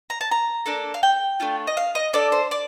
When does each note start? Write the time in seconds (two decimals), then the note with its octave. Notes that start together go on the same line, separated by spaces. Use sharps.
0.10 A#5
0.21 A5
0.31 A#5
0.66 A#3 D4 A4
0.94 F5
1.03 G5
1.40 A3 D4 F4
1.67 D#5
1.77 F5
1.95 D#5
2.13 D4 A4 D5
2.32 C5
2.51 D5